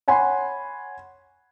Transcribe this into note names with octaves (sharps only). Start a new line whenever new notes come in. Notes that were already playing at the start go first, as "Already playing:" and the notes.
C#5 F#5 G#5 B5 C6